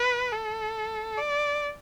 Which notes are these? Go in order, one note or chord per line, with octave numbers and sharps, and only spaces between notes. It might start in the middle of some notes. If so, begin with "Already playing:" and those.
Already playing: B4
A4
D5